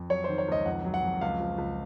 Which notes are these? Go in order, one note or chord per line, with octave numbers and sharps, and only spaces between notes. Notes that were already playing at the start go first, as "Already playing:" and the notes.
Already playing: F2
F#3 C#5
C5
D#3
C#5
C#2 D#5
F2 F#5
F#3
F#5
F2
C#2 F5
F3
C#2